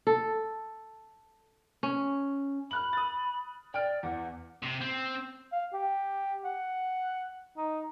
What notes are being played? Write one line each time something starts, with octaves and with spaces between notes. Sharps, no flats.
A4
C#4
B5 F6 F#6 F#7
D#6 A6
D5 G5 F6 D7
E2 F#5
C3
C4
F5
G4
F#5
D#4